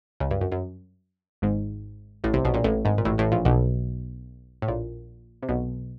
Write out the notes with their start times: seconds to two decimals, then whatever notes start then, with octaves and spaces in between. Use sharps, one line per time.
0.20 C#2 C#3
0.31 G2
0.41 F#2
0.52 F#2
1.42 G#1 G#2
2.24 A1 A2
2.34 C2 C3
2.45 B1 B2
2.54 A#1 A#2
2.64 A1 A2
2.85 G#1 G#2
2.98 A#2
3.05 A1 A2
3.18 A1 A2
3.32 A#1 A#2
3.45 B1 B2
4.62 A2
4.68 A#1 A#2
5.43 C3
5.49 B1 B2